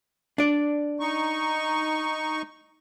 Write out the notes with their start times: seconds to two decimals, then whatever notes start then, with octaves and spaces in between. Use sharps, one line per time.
0.38 D4 D5
1.00 D#4 C#6